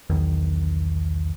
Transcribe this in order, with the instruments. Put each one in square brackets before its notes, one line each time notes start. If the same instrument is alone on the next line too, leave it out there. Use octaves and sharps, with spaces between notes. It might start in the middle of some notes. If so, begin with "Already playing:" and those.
[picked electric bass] B1 E2 D#3